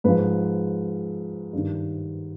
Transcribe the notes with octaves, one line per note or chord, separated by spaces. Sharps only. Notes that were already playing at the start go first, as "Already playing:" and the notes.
G#2 F3 B4
G2 D#3